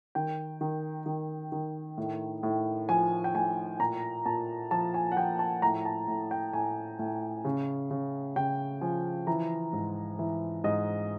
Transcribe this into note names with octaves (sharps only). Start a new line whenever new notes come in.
D#3 G5
D#3
D#3
D#3
A2
A2
F3 G#5
G5
A2 G#5
A#2 A#5
A#2 A5
F3 A5
G#5
F#5
F3 G5
A5
A2 A#5
A5
A2
G5
A2 G#5
A2
C#3
C#3
C#3 G5
F3 G#5
E3 A#5
G#2
E3
G#2 D#5